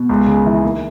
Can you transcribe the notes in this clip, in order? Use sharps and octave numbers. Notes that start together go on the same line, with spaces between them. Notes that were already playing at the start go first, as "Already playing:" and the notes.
Already playing: B2
C#2
C#3
E3
D#2